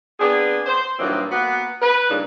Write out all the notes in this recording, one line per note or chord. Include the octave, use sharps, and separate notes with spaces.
B3 C4 D4 G#4
C5
G2 A#2 E3 F#3 C4 D#4
A#3 B3 F#4
B4
G2 A#2 C#3 D4 D#4